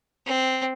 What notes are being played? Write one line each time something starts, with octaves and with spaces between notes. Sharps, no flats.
C4